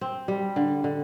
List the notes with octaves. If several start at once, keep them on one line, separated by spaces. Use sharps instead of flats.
C4
G3
D3
D3